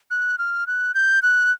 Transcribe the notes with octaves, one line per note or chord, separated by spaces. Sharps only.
F#6
F6
F#6
G6
F#6